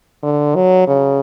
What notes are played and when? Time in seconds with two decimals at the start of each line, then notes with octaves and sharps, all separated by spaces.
0.23 D3
0.55 F#3
0.87 C#3